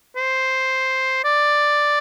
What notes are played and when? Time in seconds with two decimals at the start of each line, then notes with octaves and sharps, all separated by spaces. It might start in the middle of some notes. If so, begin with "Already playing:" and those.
0.16 C5
1.24 D5